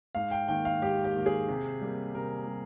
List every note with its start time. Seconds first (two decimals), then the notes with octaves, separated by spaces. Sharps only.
0.15 G#2 F5
0.31 G5
0.48 D#3 A#3 G5
0.65 F5
0.82 G#2 G4
1.04 G4
1.15 D#3 A#3
1.26 G#4
1.48 C3
1.81 G3 A#3
2.15 C3 A#4
2.47 G3